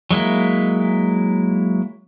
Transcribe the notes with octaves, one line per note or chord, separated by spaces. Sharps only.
F#3 G#3 A#3 E4